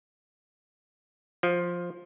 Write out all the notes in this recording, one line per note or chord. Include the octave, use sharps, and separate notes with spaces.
F3